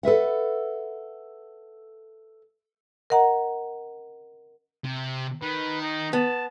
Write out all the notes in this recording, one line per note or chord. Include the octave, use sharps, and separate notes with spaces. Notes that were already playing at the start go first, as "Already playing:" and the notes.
A4 B4 E5 F#5
A#4 D#5 F#5 A#5
C3
D#3 B4
D#4
B3 A5